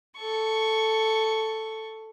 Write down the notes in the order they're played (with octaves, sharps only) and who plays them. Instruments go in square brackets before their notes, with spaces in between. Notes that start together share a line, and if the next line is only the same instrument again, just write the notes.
[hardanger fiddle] A4 C#6